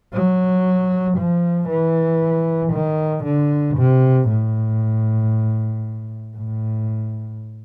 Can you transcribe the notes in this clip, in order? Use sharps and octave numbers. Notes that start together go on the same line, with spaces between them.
F#3
F3
E3
D#3
D3
C3
A2
A2